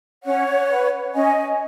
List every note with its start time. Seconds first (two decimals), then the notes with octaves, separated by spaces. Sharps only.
0.24 C#4 C#5 F#5
0.70 B4
1.14 C#4 D#5 G#5